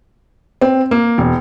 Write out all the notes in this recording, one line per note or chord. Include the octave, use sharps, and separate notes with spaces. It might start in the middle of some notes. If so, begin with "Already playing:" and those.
C4
A#3
E1